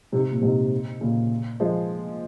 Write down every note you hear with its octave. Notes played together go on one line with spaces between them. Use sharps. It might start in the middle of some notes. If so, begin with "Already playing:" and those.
G#2 C3
A#2
G#2 C3
A#2 C#3
F3 G#3